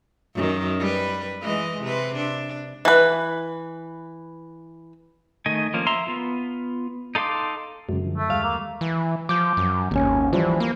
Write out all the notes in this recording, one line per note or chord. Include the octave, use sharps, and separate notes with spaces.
F#2 D#3
G3 B4
E3 G#3 D#5
C3 B4
D4
E3 B4
D#3 A3 D#5 G#5
F3 A#3 C#4
E5 A#5 C6
B3 F4
D#4 A4 F5 C6 D6
F#2 C#3 G#3
D3 F3
A3
D#2 G3 G#3 F5
A#3
E3
F3 D6 G6
F#2
G#1 D#2 C#4
E3 F3 G3
A#3